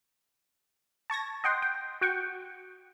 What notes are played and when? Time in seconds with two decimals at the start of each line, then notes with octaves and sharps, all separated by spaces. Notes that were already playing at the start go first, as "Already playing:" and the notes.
1.10 A5 C#6 G#6 A#6
1.44 D#5 F#5 G5 C6
1.62 G5
2.01 F#4 F#5 G5 C#6